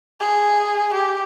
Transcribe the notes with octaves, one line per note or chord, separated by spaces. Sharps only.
G#4
G4